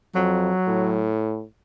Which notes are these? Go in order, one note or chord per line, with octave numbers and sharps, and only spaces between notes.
F2 F#3
A2